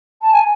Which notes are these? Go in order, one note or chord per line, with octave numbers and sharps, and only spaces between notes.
A5
G#5